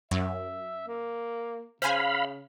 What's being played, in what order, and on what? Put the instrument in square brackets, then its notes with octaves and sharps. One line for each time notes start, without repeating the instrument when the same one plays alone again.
[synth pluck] F#2 F#3 [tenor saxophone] E5
[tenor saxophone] A#3
[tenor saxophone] C#3 [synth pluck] C5 G#5 [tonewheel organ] F5 B5